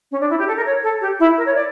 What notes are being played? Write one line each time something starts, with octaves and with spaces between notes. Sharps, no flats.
C#4
D4
E4
G4
A4
A#4
C#5
A4
G4
E4
A#4
C#5
D5